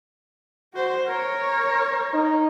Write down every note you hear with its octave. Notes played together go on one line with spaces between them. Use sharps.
F#4 C5
A#4 C#5
D#4